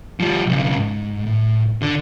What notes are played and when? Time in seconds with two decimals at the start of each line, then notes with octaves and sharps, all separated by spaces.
0.20 F3 G3
0.46 B1 C#3
0.76 G#2
1.26 A2
1.82 D3 D4